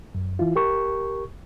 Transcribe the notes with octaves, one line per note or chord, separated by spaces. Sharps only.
F#2
E3 E4 F4
G4 A#4 C#6